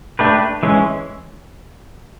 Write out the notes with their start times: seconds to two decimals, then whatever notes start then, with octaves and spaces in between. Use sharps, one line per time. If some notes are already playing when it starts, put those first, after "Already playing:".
0.19 A3 D4 G4 B4
0.63 E3 G#3 C#4